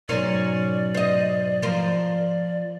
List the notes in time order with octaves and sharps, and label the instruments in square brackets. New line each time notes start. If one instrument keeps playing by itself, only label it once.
[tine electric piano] G#2 B2 F#3 [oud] C#4 A#4 C5 [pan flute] D5
[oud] C5 D#5
F3 A#4 C5